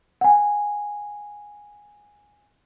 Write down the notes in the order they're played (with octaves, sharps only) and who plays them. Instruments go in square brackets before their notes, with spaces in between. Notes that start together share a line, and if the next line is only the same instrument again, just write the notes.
[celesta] F#5 G#5